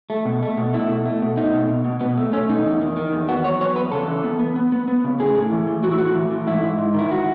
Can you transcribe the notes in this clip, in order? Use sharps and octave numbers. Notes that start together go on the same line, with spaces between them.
A3
B2
A3
B2
A3 E4
B2
A3
B2
A3 D#4
B2
B2
B2
B2 B3
A3
A3 C#4
B2 D#4
E2
D#3
D#3
E2
B3 F#4
F#3 C#5
B3 C#5
E2 B4
C#3 A4
E3
B3
B3
B3
B3
B3
C#3
A2 G#4
A2
E3
A2
A2 F#4
E4
A2 F#4
E3
A2
G#2 E4
G#2
G#2
D#3 E4
F#4